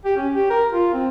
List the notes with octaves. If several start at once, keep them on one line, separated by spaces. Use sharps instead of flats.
G4
C#4
G4
A#4
F4
C4